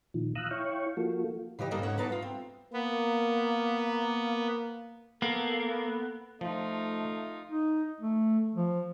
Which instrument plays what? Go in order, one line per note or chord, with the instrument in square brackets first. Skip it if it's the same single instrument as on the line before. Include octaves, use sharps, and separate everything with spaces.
[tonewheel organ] A#2 D#3 F3
F5 A#5 D#6 E6 F#6
E4 C#5 F5 G5 C#6
F3 A#3 F4 F#4 A4
[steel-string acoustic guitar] C#3 E3 G4 D#5
G2 C#3 A#3 D4 A4 D#5
G#2 A#3 C#4 C#5 F#5
B3 D4 D#4 A5
A3 F4
C4
[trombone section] A#3 [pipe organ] B3
[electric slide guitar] A#3 [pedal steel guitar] B3 [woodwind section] A4
[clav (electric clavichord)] F3 [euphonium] A3 [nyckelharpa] D#4 F4
[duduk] D#4
A3
F3